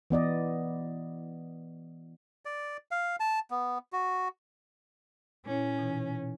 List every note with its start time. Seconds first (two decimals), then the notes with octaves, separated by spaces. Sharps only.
0.10 E3 B3 D5 D#5
2.45 D5
2.91 F5
3.20 A5
3.50 B3
3.93 F#4
5.46 A#2 C#4 E4 C#5
5.79 B2 E3 D#4